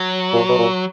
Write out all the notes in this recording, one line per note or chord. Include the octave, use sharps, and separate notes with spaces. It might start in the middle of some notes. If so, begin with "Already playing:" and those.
Already playing: F#3
A#2
B2
A#2